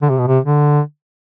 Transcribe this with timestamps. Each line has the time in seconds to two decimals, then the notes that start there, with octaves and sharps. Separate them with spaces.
0.02 D3
0.10 C3
0.18 B2
0.27 C3
0.45 D3